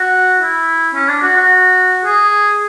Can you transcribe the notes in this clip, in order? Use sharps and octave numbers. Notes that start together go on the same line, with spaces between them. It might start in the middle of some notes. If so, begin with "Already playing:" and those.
Already playing: F#4
E4
C#4
D4
F#4
F#4
G#4